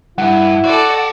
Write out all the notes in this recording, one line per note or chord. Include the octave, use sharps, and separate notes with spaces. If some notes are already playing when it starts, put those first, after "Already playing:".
G2 E4 F#5
F#4 A4 D5